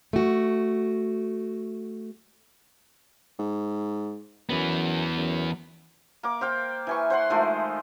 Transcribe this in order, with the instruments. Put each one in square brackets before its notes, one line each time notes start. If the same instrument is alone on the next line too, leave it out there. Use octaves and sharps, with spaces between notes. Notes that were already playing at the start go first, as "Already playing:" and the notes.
[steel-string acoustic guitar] A3 F#4
[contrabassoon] G#2
[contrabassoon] F#2 [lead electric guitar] E3 B3
[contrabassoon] F#2
[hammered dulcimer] A#3 D6
C5 F5 G5
E3 G#5 C#6
C5 F#5 C6
D#3 F3 G#3 A3